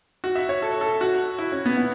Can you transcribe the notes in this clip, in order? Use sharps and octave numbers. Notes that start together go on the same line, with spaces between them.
F#4
E5
C#5
A4
A4
F#4
E4
C#4
B3
B3